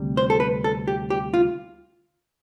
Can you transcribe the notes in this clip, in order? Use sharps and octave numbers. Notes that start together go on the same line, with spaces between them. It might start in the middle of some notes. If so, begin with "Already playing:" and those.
Already playing: D2 C3 G3
C5
A4
B4
A4
G4
G4
F4